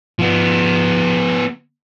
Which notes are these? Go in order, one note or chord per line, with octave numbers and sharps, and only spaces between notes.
F3 B3